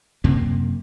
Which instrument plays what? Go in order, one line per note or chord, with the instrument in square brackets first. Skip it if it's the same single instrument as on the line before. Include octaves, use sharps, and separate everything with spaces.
[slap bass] F#2 C3 A#3